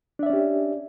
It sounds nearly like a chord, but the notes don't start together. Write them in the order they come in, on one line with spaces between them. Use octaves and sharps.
D4 E5 D5 C#4 G4